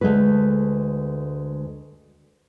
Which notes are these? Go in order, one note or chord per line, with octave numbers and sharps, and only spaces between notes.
D2 C3 G#3 A4 B4